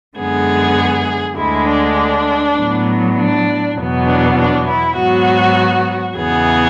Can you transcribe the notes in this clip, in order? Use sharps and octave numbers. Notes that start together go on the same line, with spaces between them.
F#2 D3 G#3 B3 G#4
D2 D3 G#3 E4
D4
A2 F#3 B3
D4
E2 B2 F#3 B3
D4
D4
E4
G#2 F#3 B3 F#4
E2 C#3 E3 B3 G#4